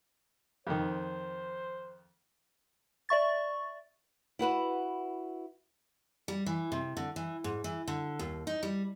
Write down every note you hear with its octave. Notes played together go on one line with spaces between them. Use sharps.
F2 D#3 C5
D5 E5 C#6 A6
E4 F#4 B4 F#5
G3
E3
C3
D3
E3
G#2
E3
D3
D#2
D#4
G3